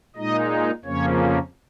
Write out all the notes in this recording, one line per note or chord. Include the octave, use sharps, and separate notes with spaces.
A#2 G#3 D#4 D#5
F2 C#3 F3 A#3 C#4 C#5